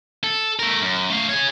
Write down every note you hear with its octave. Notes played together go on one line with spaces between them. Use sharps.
A4
A3 A#4
F#2
A3 F5
G#4 C#5